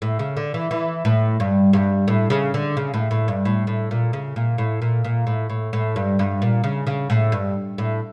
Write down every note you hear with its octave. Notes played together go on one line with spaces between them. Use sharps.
A2
C#3
D3
E3
E3
A2
G2
G2
A2
C#3
D3
C#3
A2
A2
G2
A2
A2
A#2
C#3
A#2
A2
A#2
A#2
A2
A2
A2
G2
G2
A#2
C#3
C#3
A2
G2
A2